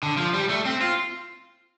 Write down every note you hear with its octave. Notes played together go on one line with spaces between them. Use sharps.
D3
F3
G3
A3
C4
F4